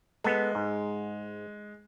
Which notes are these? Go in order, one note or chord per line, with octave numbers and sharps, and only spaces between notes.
G#3 B3 A4
G#2